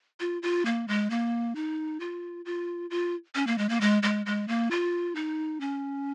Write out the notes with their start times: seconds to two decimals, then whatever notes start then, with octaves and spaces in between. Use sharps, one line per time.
0.20 F4
0.43 F4
0.65 A#3
0.88 G#3
1.10 A#3
1.55 D#4
2.00 F4
2.45 F4
2.90 F4
3.35 C#4
3.47 A#3
3.58 G#3
3.69 A#3
3.81 G#3
4.03 G#3
4.26 G#3
4.48 A#3
4.71 F4
5.15 D#4
5.60 C#4